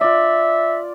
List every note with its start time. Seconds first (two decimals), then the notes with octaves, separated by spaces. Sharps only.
0.01 F4 D5 E5